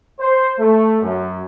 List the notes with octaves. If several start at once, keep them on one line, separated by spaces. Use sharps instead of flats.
C5
A3
F#2